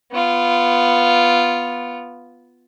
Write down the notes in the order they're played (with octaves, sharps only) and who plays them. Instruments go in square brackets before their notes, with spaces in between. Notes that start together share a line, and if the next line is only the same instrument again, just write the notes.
[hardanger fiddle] B3 F4